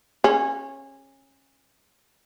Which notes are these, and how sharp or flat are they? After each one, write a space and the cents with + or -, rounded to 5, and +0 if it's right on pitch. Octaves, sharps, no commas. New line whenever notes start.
C#4 -25 G#4 +10